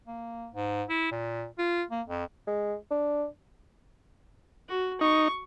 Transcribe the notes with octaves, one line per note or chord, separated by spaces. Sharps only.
A#3
G#2
E4
A#2
F4
A#3
F2
G#3
D4
F#4
D#4 C#6